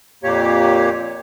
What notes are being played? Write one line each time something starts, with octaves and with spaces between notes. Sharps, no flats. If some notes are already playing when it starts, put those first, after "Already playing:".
F2 A#2 A#3 G4 C#5